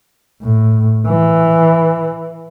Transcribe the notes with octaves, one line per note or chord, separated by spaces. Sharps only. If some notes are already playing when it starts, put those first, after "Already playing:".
A2
E3